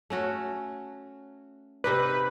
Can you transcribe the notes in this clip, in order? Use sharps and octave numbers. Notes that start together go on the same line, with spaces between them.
A3 C#4 F#4
C3 D#4 B4 D5